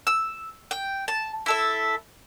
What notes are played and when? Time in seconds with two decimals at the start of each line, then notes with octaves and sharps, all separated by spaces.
0.07 E6
0.71 G5
1.08 A5
1.46 E4 A4 E5